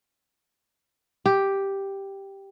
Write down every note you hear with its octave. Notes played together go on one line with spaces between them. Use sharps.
G4